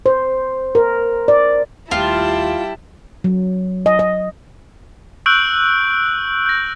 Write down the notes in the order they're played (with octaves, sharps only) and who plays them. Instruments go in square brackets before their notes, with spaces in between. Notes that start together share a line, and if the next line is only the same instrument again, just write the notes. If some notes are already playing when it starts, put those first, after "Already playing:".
[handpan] C5
A#4
D5
[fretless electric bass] D#2 A3 [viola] G3 G5 [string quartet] E4 A5 [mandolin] F4
[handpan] F#3
D#5
D#5
[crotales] C#6 E6 F#6 G6 D7 F#7
G6 A#6